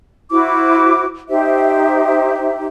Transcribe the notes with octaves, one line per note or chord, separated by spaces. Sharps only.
E4 F#4 C5 D6
D#4 G4 C5 E5